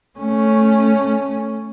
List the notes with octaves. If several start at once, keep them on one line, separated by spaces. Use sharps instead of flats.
A3 C#4